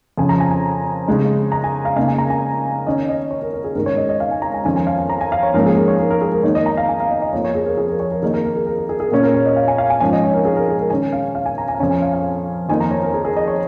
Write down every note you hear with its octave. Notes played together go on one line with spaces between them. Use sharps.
F2 C#3 F3 C#4 G#5
A#5
G#5
G#5
C#3 G#3 D#4
A#5
G#5
F5
C#3 A#3 D#4 F5
G#5
A#5
G#5
D#3 C#4 D#5
D#5
C#5
A#4
A#4
G#4
G#2 D#3 G#3 C#4 A#4
C#5
D#5
D#5
F5
G#5
A#5
G#5
F2 D#3 C#4 G#5
G#5
F5
G#5
A#5
G#5
F5
C#5
G#2 F3 A#3 C#4 A#4
G#4
A#4
C#5
A#4
A#4
G#4
A#4
D#3 A#3 D#4 C#5
D#5
A#5
F5
G#5
F5
D#5
D#5
F2 F3 A#3 C#5
C#5
G#4
A#4
G#4
A#4
C#5
A#4
D#3 A#3 D#4 G#4
A#4
A#4
G#4
A#4
A#4
G#4
G#4
A#2 A#3 C#4 G#4
A#4
C#5
D#5
F5
G#5
F5
G#5
G#2 F3 C#4 G#5
D#5
C#5
A#4
G#4
A#4
G#4
A#4
D#3 C#4 G#5
F5
F5
G#5
A#5
G#5
F5
F2 F3 C#4 G#5
G#5
F5
F5
F2 D#3 A#3 D#4 G#5
A#5
C#5
A#4
G#4
G#4
D#5
C#5